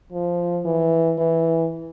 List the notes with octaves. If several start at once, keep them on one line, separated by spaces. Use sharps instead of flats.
F3
E3
E3